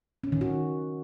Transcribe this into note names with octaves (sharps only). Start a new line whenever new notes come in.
C#4
D#3
F#4